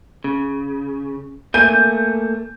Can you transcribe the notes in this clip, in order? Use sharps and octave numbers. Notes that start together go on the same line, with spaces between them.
C#3
A3 A#3 G#5 G6 D#7